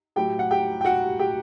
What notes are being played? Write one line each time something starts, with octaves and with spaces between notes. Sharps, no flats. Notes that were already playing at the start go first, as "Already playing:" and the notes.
A2 F#3 G4 G5
F#5
G4 G5
G5
F#4 F#5
G4 G5